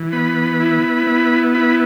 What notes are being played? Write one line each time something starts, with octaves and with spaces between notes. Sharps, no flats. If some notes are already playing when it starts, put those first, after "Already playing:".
Already playing: E3
B3 B5
E4
B3
E4 B5